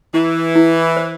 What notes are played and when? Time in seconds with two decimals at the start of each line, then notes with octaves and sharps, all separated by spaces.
0.14 E3 E4
0.55 E4
0.97 C5